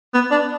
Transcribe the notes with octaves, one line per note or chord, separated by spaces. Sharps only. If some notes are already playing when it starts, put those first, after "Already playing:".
B3
D4